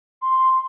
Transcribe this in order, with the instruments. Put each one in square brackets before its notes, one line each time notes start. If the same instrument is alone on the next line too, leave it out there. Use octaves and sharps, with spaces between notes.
[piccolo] C6